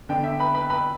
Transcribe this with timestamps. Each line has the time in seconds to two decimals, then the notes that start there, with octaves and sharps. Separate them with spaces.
0.09 D3 B3 D4 G5
0.24 E5
0.39 B4 B5
0.54 B4 B5
0.70 B4 B5